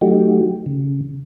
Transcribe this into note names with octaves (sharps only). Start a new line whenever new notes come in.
F#3 A3 D#4 F#4 G4
C#3